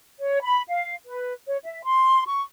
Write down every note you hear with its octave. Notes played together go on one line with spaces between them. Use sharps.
C#5
B5
F5
B4
C#5
E5
C6
C#6